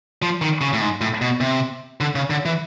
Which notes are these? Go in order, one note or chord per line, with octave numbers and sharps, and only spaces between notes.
F3
D#3
C#3
A2
G#2
A2
B2
C3
D3
C#3
D3
E3